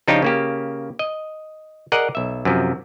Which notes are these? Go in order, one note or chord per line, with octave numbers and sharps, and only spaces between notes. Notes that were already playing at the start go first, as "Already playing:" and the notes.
C#3 F3 D4 D#4 F4 G4
C#3 A#3 G4
D#5
G#4 A#4 D5 D#5 F#5
B1 E5
F#2 C3 F3